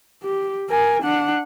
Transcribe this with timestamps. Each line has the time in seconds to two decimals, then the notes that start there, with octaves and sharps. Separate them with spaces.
0.23 G4
0.70 A#4 G#5
1.03 D4 F#5